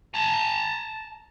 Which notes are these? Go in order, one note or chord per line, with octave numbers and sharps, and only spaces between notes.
A5 A#5